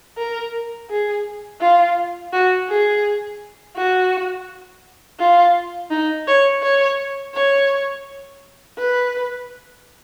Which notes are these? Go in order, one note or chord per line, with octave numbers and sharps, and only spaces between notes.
A#4
G#4
F4
F#4
G#4
F#4
F4
D#4
C#5
C#5
C#5
B4